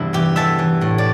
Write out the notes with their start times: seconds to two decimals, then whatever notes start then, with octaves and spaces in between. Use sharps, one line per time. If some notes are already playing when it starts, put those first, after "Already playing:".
Already playing: E2 G2 C3 E4
0.13 E3 G4
0.36 E2 E5 A5
0.59 E3
0.81 A2
0.98 D5